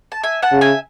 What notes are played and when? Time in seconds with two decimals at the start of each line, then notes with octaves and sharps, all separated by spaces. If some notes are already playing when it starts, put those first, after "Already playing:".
0.12 A5
0.23 E5 G#5
0.42 F#5 A5
0.52 C#3
0.61 E5 G#5